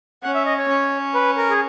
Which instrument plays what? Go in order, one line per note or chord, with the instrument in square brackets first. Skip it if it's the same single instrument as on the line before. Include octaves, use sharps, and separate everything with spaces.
[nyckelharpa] C#4 [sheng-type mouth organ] F#5
[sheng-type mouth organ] E5
D#5
C#5
[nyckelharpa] C#4
[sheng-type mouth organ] B4
A#4
G#4